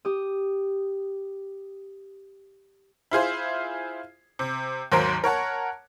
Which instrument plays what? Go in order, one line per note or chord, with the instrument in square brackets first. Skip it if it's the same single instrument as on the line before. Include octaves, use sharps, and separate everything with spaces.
[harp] G4 D#6
[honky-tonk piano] E4 F4 G#4 C5
C3
D#2 G#2 F#3 A#4 C5 D7
A#4 C#5 F#5 A5